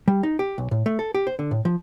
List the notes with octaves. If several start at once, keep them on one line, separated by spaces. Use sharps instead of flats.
G3
D#4
G4
B1
A2
A3
A4
G4
C5
D3
A2
F3